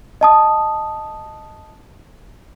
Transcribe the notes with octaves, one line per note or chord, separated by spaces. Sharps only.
D#5 A5 D#6